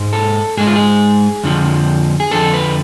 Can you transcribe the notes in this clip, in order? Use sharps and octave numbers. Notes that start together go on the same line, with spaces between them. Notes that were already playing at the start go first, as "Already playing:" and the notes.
Already playing: G#2 G#3
A4
G#2 G#3 G#4
F4
G#4
F2 D3 F3
G#4
F2 D3 F3 A4
B4